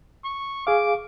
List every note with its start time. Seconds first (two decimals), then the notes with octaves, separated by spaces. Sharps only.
0.25 C#6
0.67 G#4 F5 D6